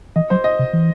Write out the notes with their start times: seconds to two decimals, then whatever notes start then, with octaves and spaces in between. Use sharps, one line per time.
0.16 E3 D#5
0.30 F#3 C5
0.44 D#5
0.59 C3
0.73 E3